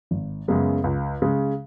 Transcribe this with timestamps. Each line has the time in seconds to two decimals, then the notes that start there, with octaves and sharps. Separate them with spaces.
0.11 G#1
0.48 F#2 C#3 G#3 B3
0.84 C#2
1.22 C#3 G#3